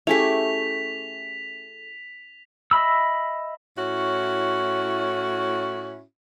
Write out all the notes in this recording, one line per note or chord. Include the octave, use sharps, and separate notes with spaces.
A3 C#4 E4 G4 G#4 B6 F7
D#5 E5 B5 E6
A2 C#4 E4 F#4